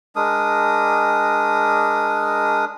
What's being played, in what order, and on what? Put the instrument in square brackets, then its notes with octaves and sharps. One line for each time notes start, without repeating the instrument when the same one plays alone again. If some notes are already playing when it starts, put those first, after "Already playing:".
[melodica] G#3 D4 A#4 D#6